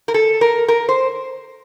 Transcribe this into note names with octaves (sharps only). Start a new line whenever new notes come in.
A#4
A4
A#4
A#4
C5